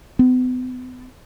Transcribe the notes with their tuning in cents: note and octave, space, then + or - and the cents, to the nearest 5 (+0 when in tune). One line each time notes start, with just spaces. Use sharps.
B3 +40